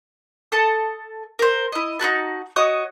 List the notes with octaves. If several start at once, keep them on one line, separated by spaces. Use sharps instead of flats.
A4 A5 D#6
A#4 C5
E4 D#5
D#4 E4 F#4 A5
F#4 C#5 D#5 D#6